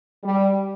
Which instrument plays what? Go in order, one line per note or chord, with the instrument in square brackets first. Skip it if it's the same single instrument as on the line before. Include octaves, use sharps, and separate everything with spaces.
[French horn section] G3